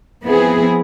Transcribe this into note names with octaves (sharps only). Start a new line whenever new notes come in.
F3 B3 C4 E4 G#4